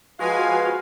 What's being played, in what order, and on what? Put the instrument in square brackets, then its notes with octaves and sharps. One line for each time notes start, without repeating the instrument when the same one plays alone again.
[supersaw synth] F3 B4 G#5 [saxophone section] G#3 F5 [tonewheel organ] F#4